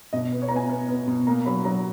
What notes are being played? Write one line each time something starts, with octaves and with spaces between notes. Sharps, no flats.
B2 D#5
B3
C#5
A#5
B3 G#5
B3
B3
B2
A#3 A#5
F#3 B5
F#3 A#5